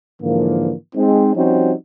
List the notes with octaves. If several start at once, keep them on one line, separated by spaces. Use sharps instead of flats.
G#2 D3 E3 F3 A#3
G#3 C4 D#4
F3 G3 C4 C#4 D#4 F#4